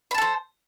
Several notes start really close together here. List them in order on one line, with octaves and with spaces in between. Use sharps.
B5 A5 A4 C5